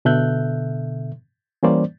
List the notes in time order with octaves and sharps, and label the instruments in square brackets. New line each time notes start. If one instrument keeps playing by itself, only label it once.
[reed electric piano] B2 D3 A4 E5 F#6 G6
E3 G3 A#3 C#4 C5 D5